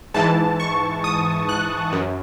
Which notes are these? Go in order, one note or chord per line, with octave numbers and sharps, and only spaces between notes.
G#2 E3 A5
C#6
D#6
F#6
F#2